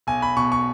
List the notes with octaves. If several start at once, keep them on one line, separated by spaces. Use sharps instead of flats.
B1 G#5
B5
B2 C#6
C#6